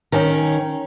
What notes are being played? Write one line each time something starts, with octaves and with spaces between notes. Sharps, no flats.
D#3 C#4